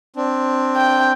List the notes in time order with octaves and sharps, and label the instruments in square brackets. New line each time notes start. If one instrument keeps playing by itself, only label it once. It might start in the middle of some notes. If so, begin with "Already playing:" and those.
[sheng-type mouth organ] C4 D4
[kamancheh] G5